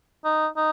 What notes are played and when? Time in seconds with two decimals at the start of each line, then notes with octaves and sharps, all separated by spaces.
0.25 D#4
0.57 D#4